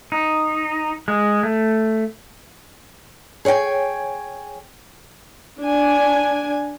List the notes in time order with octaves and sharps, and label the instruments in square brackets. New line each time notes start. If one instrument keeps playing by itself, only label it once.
[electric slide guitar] D#4
G#3
A3
[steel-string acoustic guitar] G#4 C#5 D#5 G5 G#5
[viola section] D4 G#5